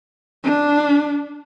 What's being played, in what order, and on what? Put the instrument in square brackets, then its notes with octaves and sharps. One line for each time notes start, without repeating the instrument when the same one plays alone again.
[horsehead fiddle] D4